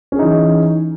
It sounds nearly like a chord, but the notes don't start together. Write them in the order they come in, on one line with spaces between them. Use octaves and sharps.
C#4 G#4 D#4 E3